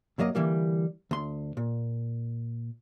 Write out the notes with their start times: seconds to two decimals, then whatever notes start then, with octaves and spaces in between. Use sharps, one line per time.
0.19 F#2 F#3 A#3 D#5
0.35 D3 E3 G3 A#3
1.11 D2 C6
1.57 A#2